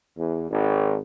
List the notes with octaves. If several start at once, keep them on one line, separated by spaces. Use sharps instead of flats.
E2
G#1